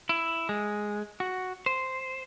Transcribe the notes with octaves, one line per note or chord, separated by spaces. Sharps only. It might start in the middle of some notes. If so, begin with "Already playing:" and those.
E4
G#3
F#4
C5